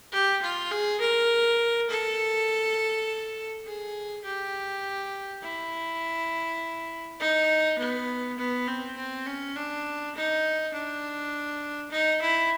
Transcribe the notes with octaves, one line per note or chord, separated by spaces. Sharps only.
G4
F4
G#4
A#4
A4
G#4
G4
E4
D#4
B3
B3
C4
C4
C#4
D4
D#4
D4
D#4
E4